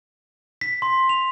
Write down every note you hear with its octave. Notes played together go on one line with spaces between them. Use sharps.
B6
C6
F7